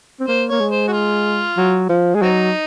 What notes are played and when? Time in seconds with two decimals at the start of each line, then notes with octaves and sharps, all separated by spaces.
0.20 C4
0.28 A#3 C5
0.50 A#3 C#5
0.60 G#3
0.71 C5
0.88 F#4
0.93 F4
1.57 F#3
1.89 F3
2.15 G#3
2.22 F#3 C4 D#4